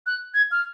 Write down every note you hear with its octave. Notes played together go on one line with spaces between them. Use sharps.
F#6
G#6
F6